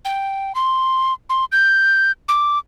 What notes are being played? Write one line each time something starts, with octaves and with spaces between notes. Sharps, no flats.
G5
C6
C6
G6
D6